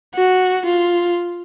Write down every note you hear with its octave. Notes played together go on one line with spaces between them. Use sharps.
F#4
F4